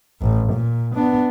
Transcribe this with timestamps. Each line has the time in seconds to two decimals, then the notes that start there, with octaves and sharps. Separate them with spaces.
0.22 A1
0.53 A#2
0.96 B3 D4